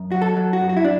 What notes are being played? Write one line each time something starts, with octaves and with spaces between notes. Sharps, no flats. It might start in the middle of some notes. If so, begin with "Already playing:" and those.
Already playing: F#2
F#3 F#4
A4
F#3
F#4
F#2
F#4
E4
D4